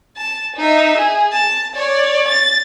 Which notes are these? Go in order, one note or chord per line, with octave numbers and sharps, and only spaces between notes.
A5
D#4 E5
G#4
A5
C#5 D5
A6